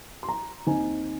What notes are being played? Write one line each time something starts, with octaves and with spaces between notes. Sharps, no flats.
C6
A#5
D#2 D#3 C4 D#4 G#5